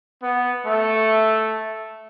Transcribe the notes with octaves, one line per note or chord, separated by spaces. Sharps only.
B3
A3